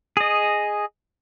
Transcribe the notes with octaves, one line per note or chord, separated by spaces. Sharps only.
G#4 D#5